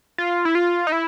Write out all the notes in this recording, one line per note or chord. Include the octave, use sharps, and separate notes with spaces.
F4
E4
F4
D#4
E4